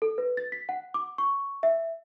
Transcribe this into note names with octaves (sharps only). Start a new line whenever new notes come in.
A4
B4
A6
B6
F#5
D6
C#6
E5